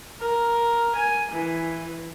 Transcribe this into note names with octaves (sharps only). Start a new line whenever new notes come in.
A#4
G#5
E3